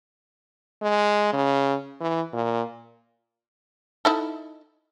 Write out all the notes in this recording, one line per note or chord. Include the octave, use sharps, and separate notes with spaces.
G#3
C#3
E3
A#2
D#4 E4 A4